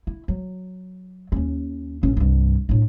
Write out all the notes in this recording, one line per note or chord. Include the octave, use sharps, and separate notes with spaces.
E4
F#3
D#2 C#4
A1 C#4
C2 G2
A2 D4